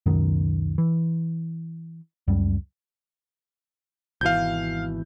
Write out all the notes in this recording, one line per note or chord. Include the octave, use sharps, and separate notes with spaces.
C#2 F#2 B2 D#3
E3
C#2 F#2 G3
G#1 B2 E3 F5 G6